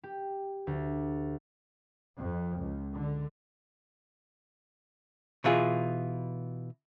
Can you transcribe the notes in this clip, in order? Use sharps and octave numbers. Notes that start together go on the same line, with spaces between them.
G4
D2
F2
C#2
D3
B2 E3 F4 G#4